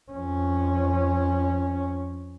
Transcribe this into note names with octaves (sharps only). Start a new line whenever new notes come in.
F2 C#4